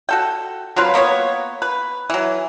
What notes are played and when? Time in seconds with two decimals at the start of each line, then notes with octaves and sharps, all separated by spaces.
0.09 F#4 A4 G5
0.76 F#3 C4 F4 B4
0.94 A#3 B3 C5 C#5
1.62 B4
2.10 E3 F#3